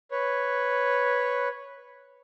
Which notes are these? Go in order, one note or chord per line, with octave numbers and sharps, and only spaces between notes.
B4 C#5